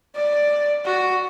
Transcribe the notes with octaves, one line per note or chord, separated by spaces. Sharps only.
D5
F#4